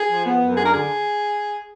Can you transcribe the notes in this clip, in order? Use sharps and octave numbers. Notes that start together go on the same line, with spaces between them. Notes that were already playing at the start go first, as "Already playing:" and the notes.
Already playing: G#4
F3
B3
F#2
D4 G#4
A#4
D3 G#4